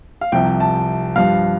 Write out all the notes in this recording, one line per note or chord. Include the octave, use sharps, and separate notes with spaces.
F5
C2 C3 F3 G5
A5
G2 F3 F5